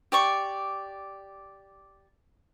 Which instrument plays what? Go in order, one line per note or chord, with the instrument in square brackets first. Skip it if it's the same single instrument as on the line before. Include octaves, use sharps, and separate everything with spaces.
[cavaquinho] G4 D5 C#6